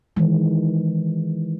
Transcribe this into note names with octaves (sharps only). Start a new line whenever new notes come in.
D#3 E3 G#3